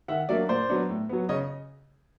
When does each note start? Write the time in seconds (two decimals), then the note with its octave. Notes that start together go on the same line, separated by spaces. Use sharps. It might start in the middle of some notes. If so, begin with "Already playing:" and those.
0.08 D#3 E5 F#5
0.29 F#3 A#3 D4 D5 E5
0.49 A#2 C5 D5
0.69 F#3 B3 D4
0.89 A2
1.09 F#3 B3
1.29 C#3 C#5 D#5